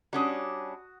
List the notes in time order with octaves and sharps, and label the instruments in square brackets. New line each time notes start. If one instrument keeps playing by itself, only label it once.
[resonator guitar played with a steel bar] G3 C#4 D4 [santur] F#4 D#6